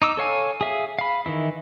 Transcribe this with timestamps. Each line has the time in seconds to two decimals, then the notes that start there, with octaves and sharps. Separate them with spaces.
0.02 D#4 D6 E6
0.17 A4 C#5 F5 G#5
0.61 G#4 E5 F5
0.99 F5 B5
1.26 D#3 E3 E4